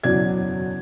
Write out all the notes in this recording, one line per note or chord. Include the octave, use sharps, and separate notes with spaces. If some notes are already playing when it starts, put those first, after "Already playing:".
F#1 E2 B2 F#3 D5 G#6